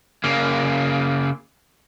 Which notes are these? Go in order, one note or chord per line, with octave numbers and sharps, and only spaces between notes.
C#3 A#3